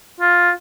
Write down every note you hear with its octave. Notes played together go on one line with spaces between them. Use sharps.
F4